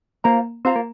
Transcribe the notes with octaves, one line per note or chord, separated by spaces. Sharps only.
A#3 F4 C5 F5 A#5
C4 F4 C5 F5 A#5
A#3